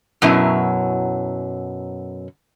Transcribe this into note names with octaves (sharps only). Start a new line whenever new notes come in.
F#2 B2 F#3 C#4 E4